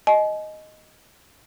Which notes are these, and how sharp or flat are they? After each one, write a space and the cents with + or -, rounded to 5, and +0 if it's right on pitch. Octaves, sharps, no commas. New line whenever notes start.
D#5 +0 G#5 +40